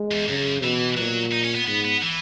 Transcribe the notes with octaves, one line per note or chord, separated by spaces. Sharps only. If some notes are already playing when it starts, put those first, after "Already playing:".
Already playing: G#3
E2
F#2 C#3
B2 E3
A#2 F#3
D#4
C#4
B3
G#2 B3
B3
E3